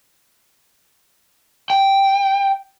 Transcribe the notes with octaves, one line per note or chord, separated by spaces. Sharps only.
G5